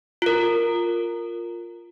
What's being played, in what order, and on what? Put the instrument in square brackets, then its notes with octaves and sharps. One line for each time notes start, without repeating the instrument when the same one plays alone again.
[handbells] F4 A#4